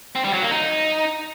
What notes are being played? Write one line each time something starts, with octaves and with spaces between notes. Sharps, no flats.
C4
G3
F#3
A#3
D#4